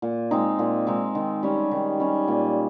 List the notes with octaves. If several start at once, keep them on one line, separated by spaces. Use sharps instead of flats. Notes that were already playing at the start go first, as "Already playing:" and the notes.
A#2
G#3 C4 D#4
A#2
G#3 C4 D#4
D#3
G3 C#4
D#3
G3 C#4
A#2